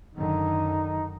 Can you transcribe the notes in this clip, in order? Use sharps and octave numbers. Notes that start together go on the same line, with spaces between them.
F#2 D3 D#3 D#4